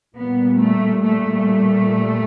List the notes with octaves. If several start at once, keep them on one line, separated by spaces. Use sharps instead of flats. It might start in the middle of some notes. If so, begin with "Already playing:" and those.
A#2 G3 B3
A3
A3